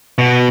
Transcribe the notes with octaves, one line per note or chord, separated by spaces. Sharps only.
B2